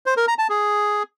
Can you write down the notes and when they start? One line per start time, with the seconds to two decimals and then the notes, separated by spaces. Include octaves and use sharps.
0.06 C5
0.17 A#4
0.28 A#5
0.39 A5
0.49 G#4